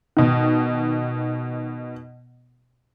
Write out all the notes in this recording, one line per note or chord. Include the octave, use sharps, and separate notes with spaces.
B2 D#3